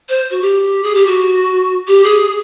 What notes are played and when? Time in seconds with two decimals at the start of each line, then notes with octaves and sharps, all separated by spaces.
0.09 C5
0.31 F#4
0.41 G4
0.83 G#4
0.95 G4
1.06 F#4
1.88 G4
2.04 G#4